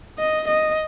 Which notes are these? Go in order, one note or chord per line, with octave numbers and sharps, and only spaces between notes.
D#5
D#5